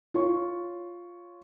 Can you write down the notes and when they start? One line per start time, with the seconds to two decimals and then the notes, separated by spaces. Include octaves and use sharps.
0.14 F4 C#5 C#6